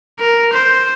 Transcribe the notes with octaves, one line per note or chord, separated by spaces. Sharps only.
A#4
C5